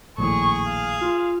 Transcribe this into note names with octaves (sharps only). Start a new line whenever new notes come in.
A#1 D#2 A2 G#4 C#6
F5
F4